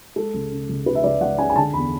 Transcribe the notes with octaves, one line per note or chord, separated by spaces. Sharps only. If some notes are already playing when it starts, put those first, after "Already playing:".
G#3 A4
C#2
C#3
C#2
C#2 B4
E5
C#2 D5
C#2 F#5
C#4 G#5
G#5
D3 A5
E2 B5